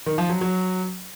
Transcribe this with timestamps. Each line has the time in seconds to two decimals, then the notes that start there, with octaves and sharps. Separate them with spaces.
0.06 D#3
0.18 F3
0.30 F#3
0.41 F#3